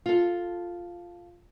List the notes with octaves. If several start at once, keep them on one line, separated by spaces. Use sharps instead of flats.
F4 A4